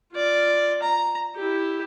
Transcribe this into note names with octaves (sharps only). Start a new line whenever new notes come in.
F4 D5
A#5
E4 G4